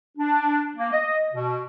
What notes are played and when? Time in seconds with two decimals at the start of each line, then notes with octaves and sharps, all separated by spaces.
0.18 D4
0.77 A#3
0.91 D#5
1.34 B2